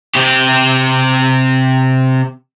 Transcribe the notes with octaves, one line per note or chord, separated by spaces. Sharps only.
C3 G4